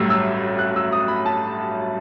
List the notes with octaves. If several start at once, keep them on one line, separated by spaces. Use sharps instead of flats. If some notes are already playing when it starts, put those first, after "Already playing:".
Already playing: A1 G2 F#3 A3 E6
E6
F#6
E6
D#6
B5
A5